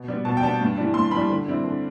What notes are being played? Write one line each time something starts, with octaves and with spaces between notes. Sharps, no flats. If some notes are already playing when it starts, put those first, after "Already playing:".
Already playing: B2
G3 B3
B2 A5
G5
G3 B3 A5
G2
E3 G3
G2 C6
E3 B5
G3
D3
G3 C4 E4
D3